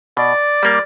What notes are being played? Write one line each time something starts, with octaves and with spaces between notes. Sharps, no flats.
B2 D5
G3 A#3